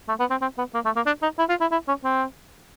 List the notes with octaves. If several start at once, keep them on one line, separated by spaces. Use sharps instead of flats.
A3
B3
C4
C4
B3
A#3
A3
A#3
D4
D#4
E4
F4
E4
E4
C#4
C4